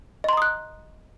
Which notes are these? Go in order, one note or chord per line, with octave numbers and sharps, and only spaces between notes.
D#5 A#5 C6 D#6 F#6